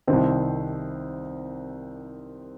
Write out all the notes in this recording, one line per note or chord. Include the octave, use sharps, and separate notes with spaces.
C2 C3 D#3 C4 C5